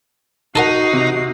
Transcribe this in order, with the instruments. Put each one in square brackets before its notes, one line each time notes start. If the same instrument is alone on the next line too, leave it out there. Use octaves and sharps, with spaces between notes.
[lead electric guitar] D#4 [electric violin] F#4 C7 [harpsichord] A4 A#4 F#5
[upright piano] C3